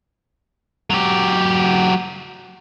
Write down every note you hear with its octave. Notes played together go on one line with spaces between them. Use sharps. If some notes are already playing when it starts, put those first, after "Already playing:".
F#3 G4